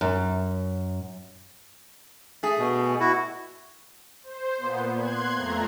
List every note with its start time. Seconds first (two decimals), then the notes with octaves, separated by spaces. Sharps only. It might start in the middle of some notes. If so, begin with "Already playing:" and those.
0.01 F#2
2.43 A3 G#4
2.59 B2
3.00 E4 F#4
4.24 C5
4.58 A#2 B3
4.93 C6 F#6 G#6
5.34 F2 A3 A#5